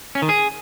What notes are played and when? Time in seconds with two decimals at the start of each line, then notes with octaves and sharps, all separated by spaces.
0.15 C#4
0.22 D#3
0.29 G#4